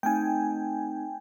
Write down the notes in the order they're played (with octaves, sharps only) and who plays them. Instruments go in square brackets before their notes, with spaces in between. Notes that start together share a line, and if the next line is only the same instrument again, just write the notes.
[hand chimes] A3 C4 D#4 [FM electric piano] G5 G#5